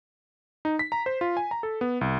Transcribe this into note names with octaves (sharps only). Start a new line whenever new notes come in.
D#4
B6
A#5
C5
F4
G#5
A#5
A4
B3
C2